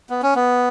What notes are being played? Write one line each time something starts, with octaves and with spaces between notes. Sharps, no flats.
B3
C#4
B3